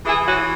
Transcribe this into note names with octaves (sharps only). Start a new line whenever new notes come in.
E3 E4 G#4
C#4 F#4